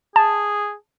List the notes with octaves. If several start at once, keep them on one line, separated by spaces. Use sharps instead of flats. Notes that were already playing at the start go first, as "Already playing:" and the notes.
G#4 A5